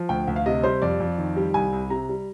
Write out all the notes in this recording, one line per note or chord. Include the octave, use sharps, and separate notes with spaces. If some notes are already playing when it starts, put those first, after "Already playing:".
Already playing: F3
D2 G5
D2
F5
C3 D#5
G3 C5
F2 D5
F2
D#3
G3
C2 G#5
C2
C3 A#5
G3